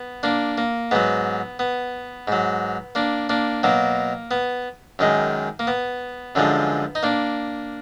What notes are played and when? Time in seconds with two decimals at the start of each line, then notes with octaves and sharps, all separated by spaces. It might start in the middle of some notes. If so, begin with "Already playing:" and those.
Already playing: B3
0.23 A#3 D4
0.58 A#3
0.91 G#2 F#3 B3
1.59 B3
2.28 G#2 F#3
2.95 A#3 D4
3.29 A#3 D4
3.63 B2 F#3 A#3
4.31 B3
4.99 F#2 D#3 G#3
5.59 A#3
5.67 B3
6.35 F#2 D3 F3 G#3
6.95 D#4
7.03 A#3 D4